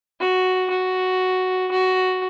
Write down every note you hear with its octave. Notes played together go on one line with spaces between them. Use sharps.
F#4
F#4
F#4